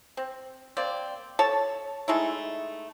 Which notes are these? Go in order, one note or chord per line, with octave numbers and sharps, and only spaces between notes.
C4
A#3 C4 D5
A4 C#5 A5
G#3 A3 D#4 E4